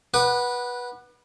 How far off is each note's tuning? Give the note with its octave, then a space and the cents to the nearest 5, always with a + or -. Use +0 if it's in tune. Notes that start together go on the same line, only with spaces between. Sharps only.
B4 -15 F#5 +0 D6 +45